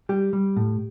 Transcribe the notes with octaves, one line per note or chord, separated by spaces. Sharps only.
G3 G4
G3
A2